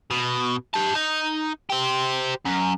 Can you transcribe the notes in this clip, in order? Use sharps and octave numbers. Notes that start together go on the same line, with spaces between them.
B2
G4 A5
D#4
G4 C5
F#2